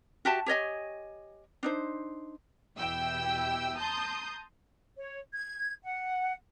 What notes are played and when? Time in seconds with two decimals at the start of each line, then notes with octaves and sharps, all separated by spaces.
0.25 F#4 G4 E5 A5
0.46 G4 C#5 D#5 G#5
1.63 D4 D#4 C5
2.77 E2 B2 E4 G4 G5 E6
3.77 A5 A#5 C6 D#6 G6
4.98 C#5
5.34 G#6
5.84 F#5